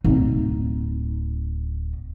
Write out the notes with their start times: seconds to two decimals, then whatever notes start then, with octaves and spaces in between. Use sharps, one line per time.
0.04 D1 D#4